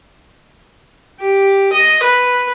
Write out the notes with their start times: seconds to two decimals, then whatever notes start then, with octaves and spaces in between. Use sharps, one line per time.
1.20 G4
1.73 D#5
2.04 B4